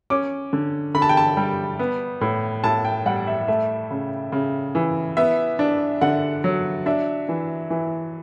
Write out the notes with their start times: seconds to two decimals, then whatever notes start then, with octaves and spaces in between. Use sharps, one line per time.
0.10 C#4 D6
0.53 D3
0.94 D3 B5
1.02 A5
1.09 G5
1.17 A5
1.37 G3
1.79 B3
2.21 A2
2.64 A2 A5
2.85 G5
3.06 G3 F#5
3.27 E5
3.48 A3 E5
3.91 C#3
4.32 C#3
4.75 E3
5.17 B3 E5
5.59 D4
6.01 D3 F#5
6.44 F#3
6.86 D4 E5
7.29 E3
7.70 E3